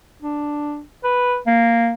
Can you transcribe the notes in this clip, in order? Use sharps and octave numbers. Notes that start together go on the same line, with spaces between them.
D4
B4
A#3